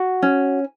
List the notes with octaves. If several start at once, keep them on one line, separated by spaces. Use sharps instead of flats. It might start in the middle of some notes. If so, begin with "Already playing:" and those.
Already playing: F#4
C#4